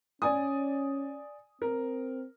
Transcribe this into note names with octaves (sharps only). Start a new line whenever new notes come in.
C#4 D5 G#5 D#6
C4 A#4